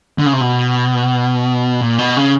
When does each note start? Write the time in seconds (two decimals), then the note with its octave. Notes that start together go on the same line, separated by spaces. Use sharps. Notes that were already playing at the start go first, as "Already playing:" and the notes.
0.19 D3
0.26 C#3
0.33 C3
0.41 B2
1.81 A#2
1.99 B2
2.17 C#3